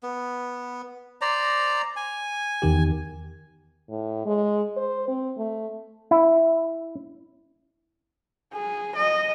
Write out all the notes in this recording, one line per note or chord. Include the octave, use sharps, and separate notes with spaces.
B3
C5 D5 A#5
G#5
E2 D#3 G4
A2
G#3
C5
C4
A3
E4
G#4
D#5